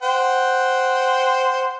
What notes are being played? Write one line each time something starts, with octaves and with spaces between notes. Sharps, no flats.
C5 F#5 G5